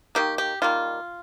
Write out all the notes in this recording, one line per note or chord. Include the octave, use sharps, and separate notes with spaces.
D#3 A#3 G4
G4
D#3 G3 A#3 F4